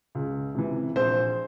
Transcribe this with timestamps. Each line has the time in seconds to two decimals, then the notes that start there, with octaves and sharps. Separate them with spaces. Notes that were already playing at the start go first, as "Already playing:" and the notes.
0.15 C#2
0.55 C3 E3
0.96 A#1 C5